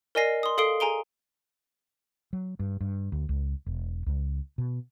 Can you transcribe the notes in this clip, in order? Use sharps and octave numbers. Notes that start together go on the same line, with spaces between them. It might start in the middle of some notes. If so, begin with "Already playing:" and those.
A#4 D5 D#5 G#5 A#6 C7
C6 D#6
A4 F5 D#6 C7 D7 G7
G#4 G#5 A#5 D7 G7
F#3
G2
G2
D2
C#2
E1
C#2
B2